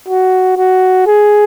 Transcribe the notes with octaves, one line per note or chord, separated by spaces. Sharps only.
F#4
F#4
G#4